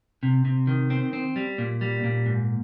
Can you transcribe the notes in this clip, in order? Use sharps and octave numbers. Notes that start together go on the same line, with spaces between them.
C3
C3
D#3
C4
C4
G3
A#2
G3
A#2
G#2